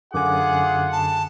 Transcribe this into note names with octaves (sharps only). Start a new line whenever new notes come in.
F#2 D3 F4 G#4 F#5 G#5 D6
A5